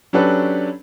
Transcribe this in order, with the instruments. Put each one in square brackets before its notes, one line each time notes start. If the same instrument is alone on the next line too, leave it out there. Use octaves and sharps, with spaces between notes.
[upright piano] F#3 C#4 D4 G4 A4 B4